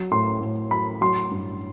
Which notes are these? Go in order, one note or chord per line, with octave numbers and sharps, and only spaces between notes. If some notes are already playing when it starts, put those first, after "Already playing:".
Already playing: F#3
A2 C6
A2
F#3 B5
F#3 C6
G2